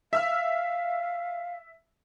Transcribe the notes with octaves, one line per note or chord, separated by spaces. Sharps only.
E5 F5 E6 F6